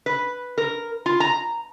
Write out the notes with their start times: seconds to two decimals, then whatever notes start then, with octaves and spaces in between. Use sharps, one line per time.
0.06 B4
0.58 A#4
1.06 F4
1.20 A#5